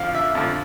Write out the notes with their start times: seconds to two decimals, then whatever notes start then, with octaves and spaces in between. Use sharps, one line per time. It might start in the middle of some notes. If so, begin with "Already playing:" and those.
Already playing: F2 D3 F3 F5
0.15 E5
0.35 F2 D3 F3